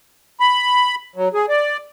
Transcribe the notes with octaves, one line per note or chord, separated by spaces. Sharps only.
B5
F#3
G#4
D5